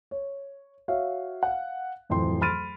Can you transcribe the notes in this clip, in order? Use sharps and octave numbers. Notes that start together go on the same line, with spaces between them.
C#5
F#4 C#5 E5 F5
F5 F#5
D1 F2 E3 G5 C6
B5 C6 F6 A6 D7 D#7